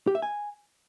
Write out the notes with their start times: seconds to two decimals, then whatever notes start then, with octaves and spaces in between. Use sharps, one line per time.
0.07 G4
0.15 E5
0.22 G#5